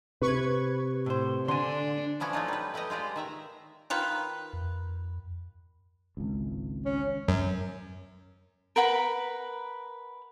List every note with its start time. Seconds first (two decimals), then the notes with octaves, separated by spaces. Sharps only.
0.22 C3 B4 C#6 G#6
1.06 A2 C5
1.48 D3 D4 G#5 C6
2.20 E3 F3 B3 C#4 D4
2.33 F#3 A3 D#4 F4
2.48 G3 B4
2.74 A3 G4 B4 D#5
2.90 G#3 F4 G4 D5
3.16 D#3 E5 A#5
3.90 D#3 F4 B4
4.53 F2
6.17 G#1 C#2
6.85 C#4
7.28 F#2
8.76 A#4 B4 F#5 B5